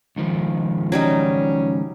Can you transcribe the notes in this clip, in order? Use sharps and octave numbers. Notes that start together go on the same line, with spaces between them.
C#2 D#3 F3
F#3 G3 C#4 D#4